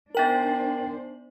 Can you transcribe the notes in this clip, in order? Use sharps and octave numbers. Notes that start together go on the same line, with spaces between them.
B3 D4 D#4 A#4 C5 G5 A6 F#7